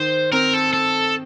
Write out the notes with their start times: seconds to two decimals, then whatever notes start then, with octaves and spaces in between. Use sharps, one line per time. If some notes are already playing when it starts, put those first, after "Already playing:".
Already playing: D#3 C5
0.32 C4 A#4
0.54 A4
0.73 A4